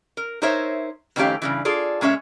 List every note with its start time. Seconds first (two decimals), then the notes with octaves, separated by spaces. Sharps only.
0.17 A#4
0.42 D#4 A#4 C5 C#5 E5
1.16 F2 D#3 A3 C#4 G4 F5
1.42 G2 C#3 E3
1.65 F4 G#4 A4 D5
2.01 A#2 G#3 C#4 C#5 E5